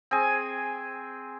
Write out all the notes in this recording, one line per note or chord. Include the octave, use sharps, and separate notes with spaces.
C4 G#4 G#5